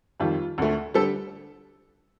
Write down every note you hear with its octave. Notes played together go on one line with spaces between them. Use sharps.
F2 D#3 G3 F4
D2 D3 A3
D3 G3 A4